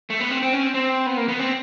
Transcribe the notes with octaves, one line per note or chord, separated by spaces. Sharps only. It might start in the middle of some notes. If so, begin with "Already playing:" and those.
A3
B3
C4
C4
C#4
C4
C4
B3
A#3
B3
C4